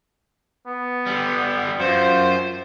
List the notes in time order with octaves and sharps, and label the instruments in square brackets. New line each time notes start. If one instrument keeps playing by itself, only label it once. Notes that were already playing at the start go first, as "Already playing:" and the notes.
[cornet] B3
[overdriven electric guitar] D3 G3
[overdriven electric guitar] F#2 [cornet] F4 [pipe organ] C5